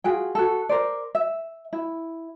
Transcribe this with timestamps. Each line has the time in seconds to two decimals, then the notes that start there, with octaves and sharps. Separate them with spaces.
0.04 F4 F#4 G#4 G5
0.35 F#4 A4
0.69 A#4 C5 D5
1.15 E5
1.73 E4